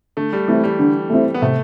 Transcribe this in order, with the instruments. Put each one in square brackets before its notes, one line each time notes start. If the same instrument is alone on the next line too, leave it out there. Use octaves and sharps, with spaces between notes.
[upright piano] D3 [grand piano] A3
[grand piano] G3
[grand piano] E3 [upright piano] A3 C4 E4
[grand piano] G3
[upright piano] D3
A3 C4 E4
[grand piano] B3
[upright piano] C3 [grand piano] A3